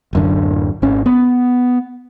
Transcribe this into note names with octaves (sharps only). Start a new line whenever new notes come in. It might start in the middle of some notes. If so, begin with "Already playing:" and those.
D1 F#2 D3
G#1 C#4
B3